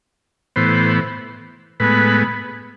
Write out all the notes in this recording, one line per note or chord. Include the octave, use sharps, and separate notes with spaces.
A2 E3 B3 C5
A2 G#3 B3 B4